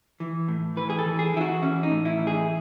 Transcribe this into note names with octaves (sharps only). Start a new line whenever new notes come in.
E3
A2
E3 B4
G#4
A4
E3
G#4
E3 E4
F#4
E3 C#4
D#4
A2
E4
E3
G#4